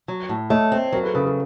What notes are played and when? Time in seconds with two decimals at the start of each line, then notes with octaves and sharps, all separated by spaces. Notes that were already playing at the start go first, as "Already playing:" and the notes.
0.08 F#3
0.29 A2
0.50 A3 C#5 D#5
0.72 C4
0.92 F#3 A#4 C5
1.03 A4 B4
1.14 C#3 A4 B4
1.25 A4 B4